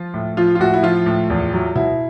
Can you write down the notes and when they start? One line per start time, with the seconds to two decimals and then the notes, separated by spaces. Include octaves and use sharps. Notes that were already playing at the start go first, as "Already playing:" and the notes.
Already playing: F3 F4
0.14 A2
0.37 F3 F4
0.55 F4
0.60 A2 F#4
0.74 E4
0.83 F3 F4
1.06 A2
1.30 E2
1.53 F#3
1.75 B2 E4